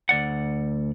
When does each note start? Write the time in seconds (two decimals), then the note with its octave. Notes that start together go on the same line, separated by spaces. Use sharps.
0.09 D2 D5 F#5